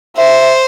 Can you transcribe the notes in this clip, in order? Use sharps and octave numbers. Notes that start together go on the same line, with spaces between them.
C5 E5